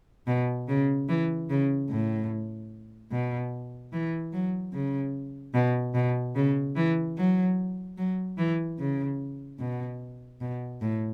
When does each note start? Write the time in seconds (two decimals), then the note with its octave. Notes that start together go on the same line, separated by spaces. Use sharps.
0.27 B2
0.68 C#3
1.08 E3
1.49 C#3
1.89 A2
3.11 B2
3.92 E3
4.33 F#3
4.73 C#3
5.54 B2
5.94 B2
6.35 C#3
6.76 E3
7.17 F#3
7.97 F#3
8.38 E3
8.78 C#3
9.59 B2
10.41 B2
10.81 A2